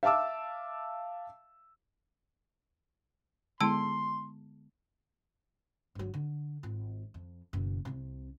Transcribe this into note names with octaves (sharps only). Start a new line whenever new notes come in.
E5 F5 A5 D6 E6
D3 G#3 B3 E4 A5 C6 E6
G1 F#3
D3
G#1 F4
F2
F#1 B2
C2 C3